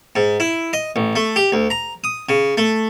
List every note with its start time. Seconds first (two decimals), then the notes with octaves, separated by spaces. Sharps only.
0.16 G#2
0.40 E4
0.73 D#5
0.96 A1
1.16 A3
1.36 G4
1.52 D2
1.70 A#5
2.04 D#6
2.29 C#3
2.57 A3